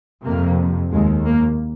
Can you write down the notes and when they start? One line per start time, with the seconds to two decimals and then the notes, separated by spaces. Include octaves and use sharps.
0.24 F2 C3 A#3
0.92 D#2 G#3
1.26 A#3